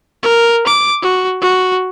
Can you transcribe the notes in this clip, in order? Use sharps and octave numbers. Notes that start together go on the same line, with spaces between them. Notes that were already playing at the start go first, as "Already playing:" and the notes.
A#4
D6
F#4
F#4